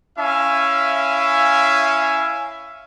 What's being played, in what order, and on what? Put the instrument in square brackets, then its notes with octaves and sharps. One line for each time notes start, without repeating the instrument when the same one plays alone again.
[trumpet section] C#4 E4 E5 F5 G#5